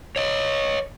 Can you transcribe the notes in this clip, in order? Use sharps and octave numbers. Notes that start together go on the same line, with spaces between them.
C#5 D#5